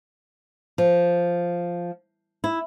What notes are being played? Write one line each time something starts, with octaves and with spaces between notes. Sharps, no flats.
F3
E4